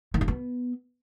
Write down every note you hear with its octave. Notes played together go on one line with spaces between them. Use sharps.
D#3
A#3
B3